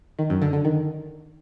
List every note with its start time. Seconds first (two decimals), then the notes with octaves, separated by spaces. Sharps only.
0.19 D#3
0.30 F#2
0.42 D3
0.53 D3
0.65 D#3